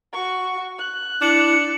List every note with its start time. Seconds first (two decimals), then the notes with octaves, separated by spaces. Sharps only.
0.13 F#4 C#6
0.78 F#6
1.22 D4 E4 C#7